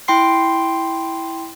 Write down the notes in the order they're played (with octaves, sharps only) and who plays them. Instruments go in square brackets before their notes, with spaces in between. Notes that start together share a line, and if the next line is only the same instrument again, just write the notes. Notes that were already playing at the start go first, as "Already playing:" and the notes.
[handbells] E4 G5 C6 C7